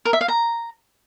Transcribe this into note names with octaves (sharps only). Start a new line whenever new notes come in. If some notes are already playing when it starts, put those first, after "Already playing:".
A#4
E5
F5
A#5